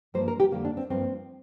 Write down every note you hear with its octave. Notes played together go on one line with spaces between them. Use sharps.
G2 F3 A#3 C5
A#4
G4
F2 D3 G3 A#3
D4
C4
G2 F3 A#3 C4